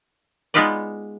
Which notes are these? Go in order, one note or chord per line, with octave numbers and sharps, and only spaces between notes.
G#3 B3 D#4 F4 B4 D5